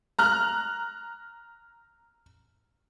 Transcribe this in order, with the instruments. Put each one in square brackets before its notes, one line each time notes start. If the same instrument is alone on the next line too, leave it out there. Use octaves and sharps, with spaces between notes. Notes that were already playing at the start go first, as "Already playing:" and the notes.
[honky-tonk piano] A#5 F6 F#6